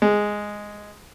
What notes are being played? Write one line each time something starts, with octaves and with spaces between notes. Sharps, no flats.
G#3